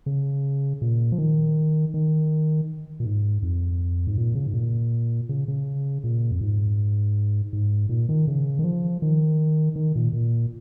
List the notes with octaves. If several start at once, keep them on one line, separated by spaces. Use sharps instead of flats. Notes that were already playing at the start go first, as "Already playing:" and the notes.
C#3
A#2
F3
D#3
D#3
A#2
G#2
F2
G#2
A#2
C#3
G#2
A#2
C#3
C#3
A#2
F2
G#2
G#2
A#2
D#3
C#3
D#3
F3
D#3
D#3
A#2
A#2